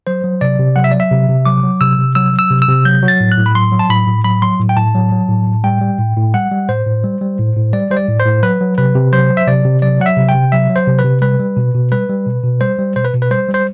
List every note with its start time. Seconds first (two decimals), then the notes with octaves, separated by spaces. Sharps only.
0.07 F#3 C5
0.24 F#3
0.41 C3 D5
0.59 C3
0.76 F#3 F#5
0.84 E5
0.92 F#3 D5
1.00 E5
1.11 C3
1.29 C3
1.45 F#3 D6
1.63 F#3
1.81 C3 E6
1.98 C3
2.15 F#3 E6
2.33 F#3
2.39 E6
2.50 C3
2.62 E6
2.68 C3
2.85 F#3 G6
3.03 F#3
3.08 A6
3.20 A2
3.32 F#6
3.38 A2
3.46 B5
3.55 F#3 C6
3.72 F#3
3.79 A5
3.90 A2 B5
4.07 A2
4.24 F#3 B5
4.42 F#3 C6
4.59 A2
4.69 G5
4.77 A2 A5
4.95 F#3
5.12 F#3
5.29 A2
5.47 A2
5.64 G3 G5
5.81 G3
5.99 A2
6.16 A2
6.34 G3 F#5
6.51 G3
6.69 A2 C5
6.86 A2
7.04 G3
7.21 G3
7.39 A2
7.56 A2
7.73 G3 D5
7.91 G3 C5
7.97 D5
8.08 A2
8.20 C5
8.26 A2
8.43 F#3 B4
8.61 F#3
8.78 C3 B4
8.95 C3
9.12 F#3 C5
9.30 F#3
9.37 E5
9.47 C3 D5
9.65 C3
9.82 F#3 D5
10.00 F#3 F#5
10.06 E5
10.17 C3
10.29 G5
10.34 C3
10.52 F#3 E5
10.70 F#3
10.76 C5
10.87 C3
10.99 B4
11.04 C3
11.21 G3 B4
11.39 G3
11.57 B2
11.74 B2
11.92 G3 B4
12.09 G3
12.26 B2
12.43 B2
12.61 G3 C5
12.79 G3
12.96 B2 C5
13.05 B4
13.14 B2
13.22 B4
13.31 G3 C5
13.49 G3
13.54 C5